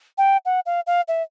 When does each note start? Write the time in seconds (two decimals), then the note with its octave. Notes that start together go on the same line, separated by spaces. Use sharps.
0.18 G5
0.45 F#5
0.66 F5
0.87 F5
1.08 E5